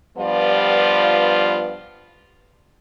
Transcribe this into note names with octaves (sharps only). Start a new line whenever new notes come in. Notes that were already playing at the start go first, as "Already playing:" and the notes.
G2 F3 G3 B3 F4 D5